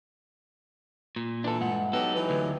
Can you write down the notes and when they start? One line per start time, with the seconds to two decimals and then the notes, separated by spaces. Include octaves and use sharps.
1.16 A#2
1.44 E3 D4 A4
1.61 G2 G#3 F#5
1.93 F#3 B3 D#4 G4 A4
2.16 E3
2.30 D2